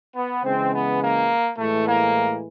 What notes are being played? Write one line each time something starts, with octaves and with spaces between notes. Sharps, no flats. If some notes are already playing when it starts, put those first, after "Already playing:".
B3
C#3 E3 G#3 C4
B3
A#3
A2 E3 G#3 A3
A#3